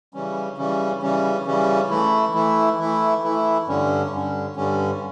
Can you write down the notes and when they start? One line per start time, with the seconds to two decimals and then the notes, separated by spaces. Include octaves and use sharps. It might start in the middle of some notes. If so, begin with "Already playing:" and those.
0.14 C#3 E3 G3 C#4
0.57 C#3 E3 G3 C#4
1.02 C#3 E3 G3 C#4
1.46 C#3 E3 G3 C#4
1.90 E3 A3 E4
2.34 E3 A3 E4
2.78 E3 A3 E4
3.23 E3 A3 E4
3.67 G2 D3 G3 C#4
4.11 G2 D3 G3 C#4
4.56 G2 D3 G3 C#4